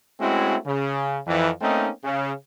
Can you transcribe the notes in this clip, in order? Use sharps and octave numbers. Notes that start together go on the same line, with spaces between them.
G#3 A3 C4 C#4 E4 F#4
C#3
F2 E3
A3 A#3 C4 C#4 D#4
C#3